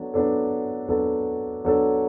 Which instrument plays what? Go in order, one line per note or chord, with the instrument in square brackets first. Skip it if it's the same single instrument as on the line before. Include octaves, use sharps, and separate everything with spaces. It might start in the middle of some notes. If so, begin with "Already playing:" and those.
Already playing: [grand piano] F#3 B3 D4 A4
F#3 B3 D4 A4
F#3 B3 D4 A4
F#3 B3 D4 A4